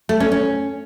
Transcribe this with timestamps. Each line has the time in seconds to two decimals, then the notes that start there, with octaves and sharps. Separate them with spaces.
0.09 A3
0.20 C#4
0.32 C#4